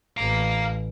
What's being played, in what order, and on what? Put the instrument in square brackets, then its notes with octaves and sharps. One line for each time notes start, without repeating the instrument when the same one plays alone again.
[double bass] A1 [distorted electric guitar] F5 A#5